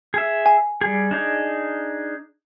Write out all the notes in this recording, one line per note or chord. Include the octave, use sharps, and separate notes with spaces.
G#4 E5
G#5
G3 G#4
D4 D#4 G#4